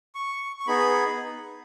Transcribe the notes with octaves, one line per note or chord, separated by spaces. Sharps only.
C#6
C#6
B3 D#4 G#4 B5